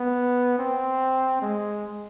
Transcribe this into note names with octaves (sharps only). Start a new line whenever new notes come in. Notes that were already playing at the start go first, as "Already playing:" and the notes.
Already playing: B3
C4
G#3